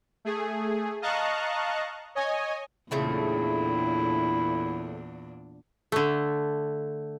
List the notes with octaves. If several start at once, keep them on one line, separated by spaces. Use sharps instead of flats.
A3 G#4
D#5 F5 A5 A#5 C#6 F#6
C#5 D#5 G#5
E2 A#2 C#3 A3 C4 D4 E4
D3 A3